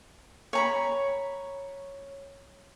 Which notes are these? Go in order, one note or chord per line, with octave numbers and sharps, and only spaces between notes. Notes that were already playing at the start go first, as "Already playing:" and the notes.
C#5 A#5 B5